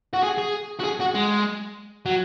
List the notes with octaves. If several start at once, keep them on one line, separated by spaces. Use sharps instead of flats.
F#4
G#4
G#4
F#4
G#4
F#4
G#3
F#3